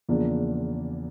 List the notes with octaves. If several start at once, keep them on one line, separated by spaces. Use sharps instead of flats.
E2 C#3 F3 A#3 D4